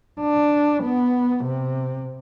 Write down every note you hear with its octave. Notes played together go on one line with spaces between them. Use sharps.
D4
B3
C3